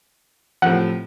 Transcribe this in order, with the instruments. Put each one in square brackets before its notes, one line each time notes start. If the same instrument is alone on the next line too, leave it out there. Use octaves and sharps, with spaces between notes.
[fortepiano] A2 C3 F3 [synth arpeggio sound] F#5